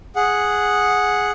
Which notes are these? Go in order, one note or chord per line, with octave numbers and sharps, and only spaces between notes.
G#4 F#5